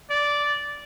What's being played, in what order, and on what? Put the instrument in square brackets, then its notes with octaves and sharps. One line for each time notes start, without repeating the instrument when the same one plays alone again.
[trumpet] D5